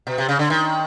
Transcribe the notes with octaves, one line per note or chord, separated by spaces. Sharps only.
B2
C3
C#3
D3
D#3